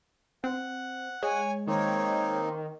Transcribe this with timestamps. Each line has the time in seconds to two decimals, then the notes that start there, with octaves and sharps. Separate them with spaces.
0.44 C4 F#5
1.23 G#3 C#5 G#5
1.67 D#3 A#3 C4 D#4 C#5